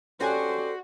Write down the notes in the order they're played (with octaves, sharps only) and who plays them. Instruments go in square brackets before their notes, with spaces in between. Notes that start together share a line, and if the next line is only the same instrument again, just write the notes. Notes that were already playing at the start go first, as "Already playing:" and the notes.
[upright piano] C#4 G4 G#5 [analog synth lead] F#4 [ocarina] A4 [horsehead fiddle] C5 D5